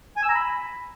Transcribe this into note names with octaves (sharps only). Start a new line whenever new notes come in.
G#5
E6
A#5
B5